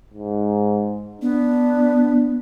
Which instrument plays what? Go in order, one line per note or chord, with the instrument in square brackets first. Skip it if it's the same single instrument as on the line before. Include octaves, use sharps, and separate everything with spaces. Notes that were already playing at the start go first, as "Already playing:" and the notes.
[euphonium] G#2
[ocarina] B3 [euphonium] D4